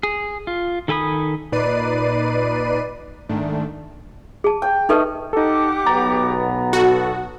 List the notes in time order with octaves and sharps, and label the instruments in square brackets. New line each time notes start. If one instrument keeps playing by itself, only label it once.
[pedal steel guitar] G#4
F4
D#3 A4 G#5 B5 D#6
[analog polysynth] A#2 D#4 B4 D5 C7 D#7
G#2 D#3 A3 D4
[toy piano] G#4 A5
[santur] G5
[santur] A3 D#5 [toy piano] D#4 A4 B4
[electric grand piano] D#4 A4 [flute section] G4 F#5 D6
[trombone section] B1 B2 B3 [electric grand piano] A#5 A6
[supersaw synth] F#4 [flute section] A4